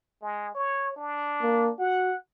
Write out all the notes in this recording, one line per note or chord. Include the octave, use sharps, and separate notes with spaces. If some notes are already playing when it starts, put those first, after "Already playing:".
G#3
C#5
D4
A#3
F#4 F#5